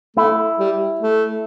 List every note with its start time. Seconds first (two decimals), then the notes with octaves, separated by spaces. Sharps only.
0.16 A3 E4
0.58 G3
1.01 A3